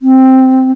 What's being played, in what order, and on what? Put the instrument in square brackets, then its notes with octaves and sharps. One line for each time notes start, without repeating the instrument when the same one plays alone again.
[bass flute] C4